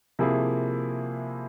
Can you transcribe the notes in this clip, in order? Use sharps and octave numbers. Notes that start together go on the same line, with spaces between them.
C3 F3 A#3 E4 G#4